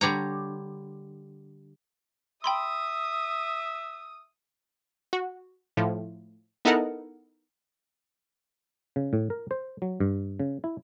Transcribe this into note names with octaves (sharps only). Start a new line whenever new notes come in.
D3 G3 C#5 A#5
E5 G5 B5 C6 D#6
F#4
A2 F3
B3 D#4 E4 A4 A#4 F#5
C#3
A2
A#4
C5
F#3
G2
C#3
E4